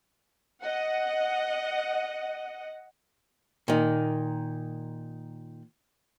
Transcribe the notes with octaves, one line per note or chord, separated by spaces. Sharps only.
D#5 F#5
A#2 D#3